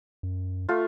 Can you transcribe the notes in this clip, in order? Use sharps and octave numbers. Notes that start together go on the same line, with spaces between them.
F#2
A3 F4